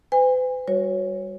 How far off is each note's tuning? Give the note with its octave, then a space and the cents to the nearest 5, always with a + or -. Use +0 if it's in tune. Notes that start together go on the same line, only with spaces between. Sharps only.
B4 +45 G#5 -35
G3 +0 F#4 +0 C#5 +0